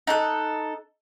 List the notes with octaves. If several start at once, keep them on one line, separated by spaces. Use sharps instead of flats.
D#4 A4 F#6